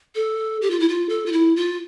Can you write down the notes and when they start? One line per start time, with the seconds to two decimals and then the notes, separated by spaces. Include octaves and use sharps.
0.15 A4
0.62 G4
0.70 F4
0.80 E4
0.89 F4
1.09 A4
1.26 F4
1.32 E4
1.56 F4